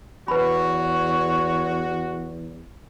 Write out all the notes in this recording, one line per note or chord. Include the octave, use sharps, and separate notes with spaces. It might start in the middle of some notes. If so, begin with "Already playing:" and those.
E2 F#4 B4 C#5 B5